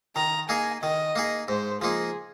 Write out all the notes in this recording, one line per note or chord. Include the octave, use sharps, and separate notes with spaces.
D#3 A#5
A#3 D#4 G#4 G#5
D#3 D#5
A#3 D#4 G#4
G#2 C5
F3 A#3 D#4 G#4